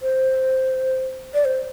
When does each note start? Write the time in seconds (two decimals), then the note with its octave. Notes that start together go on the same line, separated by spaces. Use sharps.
0.02 C5
1.34 D5
1.45 C5